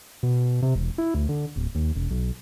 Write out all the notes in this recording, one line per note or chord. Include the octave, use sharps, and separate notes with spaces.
B2
C3
E1
E4
D2
D3
D1
D#2
E1
B1